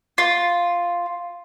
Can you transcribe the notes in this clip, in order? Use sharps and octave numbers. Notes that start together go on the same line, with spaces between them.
F4